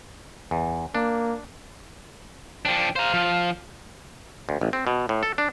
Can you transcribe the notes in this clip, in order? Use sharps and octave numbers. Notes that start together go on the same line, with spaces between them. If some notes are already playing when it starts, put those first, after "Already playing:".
E2
A#3 D4
F3 D4 G5
C5 F5 A#5
F3
D2
A1
C4
B2
A2
A4
D4